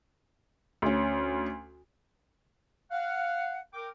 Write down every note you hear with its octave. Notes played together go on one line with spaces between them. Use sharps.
D2 C#4
F5 F#5
A#4 G5 D6